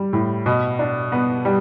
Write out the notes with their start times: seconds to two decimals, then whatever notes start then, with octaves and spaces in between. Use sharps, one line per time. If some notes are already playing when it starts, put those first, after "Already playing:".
Already playing: G3
0.13 A2
0.46 B2
0.79 D4
1.12 B3
1.45 G3